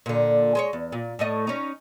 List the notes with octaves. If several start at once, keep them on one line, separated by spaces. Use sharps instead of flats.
A#2 D3
G#3 C5 C#5
E2
A#2
A2 A3 D#5
C#4 D#4